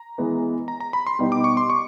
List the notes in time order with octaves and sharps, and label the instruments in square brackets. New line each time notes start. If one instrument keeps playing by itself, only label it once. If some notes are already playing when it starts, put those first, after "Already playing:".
Already playing: [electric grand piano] A#5
[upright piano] E3 G#3 B3
[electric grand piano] A#5
A#5
B5
C6
[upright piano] B2 G3 B3 D#4
[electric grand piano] D6
C#6
C6
C#6